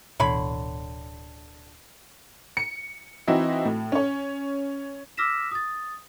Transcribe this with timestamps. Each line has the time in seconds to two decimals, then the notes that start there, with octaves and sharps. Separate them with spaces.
0.20 D1 B2 D3 E3 C#5 B5
2.57 C#7
3.27 E3 C4 D#4 E4 F#4
3.65 A2
3.92 C#4 C#5
5.17 D6 E6 F6 A#6 B6 E7
5.51 D#6 A6